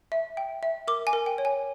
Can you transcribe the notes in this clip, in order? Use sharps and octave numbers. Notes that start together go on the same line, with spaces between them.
E5
G5
E5
A#4 D6
G#5
A#4
G5
C#5
G#5